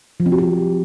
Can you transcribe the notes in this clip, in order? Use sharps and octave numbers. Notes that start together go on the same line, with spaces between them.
F3
C4
F#4
G4